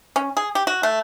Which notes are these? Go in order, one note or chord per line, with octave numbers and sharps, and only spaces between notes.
C#4
G#4
G4
F#4
A3